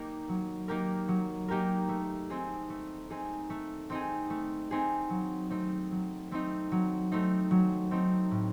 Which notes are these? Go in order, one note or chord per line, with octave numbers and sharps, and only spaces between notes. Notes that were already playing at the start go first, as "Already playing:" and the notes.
Already playing: A#3 D#4 G4 A#4
F#3
A#3 D#4 G4 A#4
F#3
A#3 D#4 G4 A#4
A3
C4 D#4 G#4
A3
C4 D#4 G#4
A3
C4 D#4 G#4
A3
C4 D#4 G#4
F#3
A3 C4 D#4
F#3
A3 C4 D#4
F#3
A3 C4 D#4
F#3
A3 C4 D#4
A2